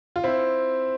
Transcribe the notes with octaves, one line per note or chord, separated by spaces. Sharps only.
F4
C4 E4